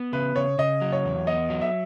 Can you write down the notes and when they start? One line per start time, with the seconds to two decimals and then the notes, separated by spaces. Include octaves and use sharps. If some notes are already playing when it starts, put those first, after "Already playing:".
Already playing: B3
0.13 C#3 B4
0.35 C#3 C#5
0.58 C#3 D#5
0.81 F#3
0.92 C#5
1.05 E2
1.27 B3 D#5
1.50 F#3
1.61 E5